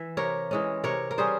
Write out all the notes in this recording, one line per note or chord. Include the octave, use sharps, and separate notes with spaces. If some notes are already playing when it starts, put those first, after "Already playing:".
Already playing: E3 E5
C3 A#4 C#5
E3 G#3 C#4
C3 A#4 C#5
A#4
G3 C#4 G#4 C5